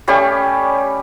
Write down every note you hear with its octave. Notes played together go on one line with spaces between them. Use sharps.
G3 A3 C#4 G4